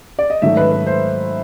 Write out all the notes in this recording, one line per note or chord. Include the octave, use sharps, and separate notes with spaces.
D5
D#5
G#2 D#3 F#3 A3 E5
B4
B4
C5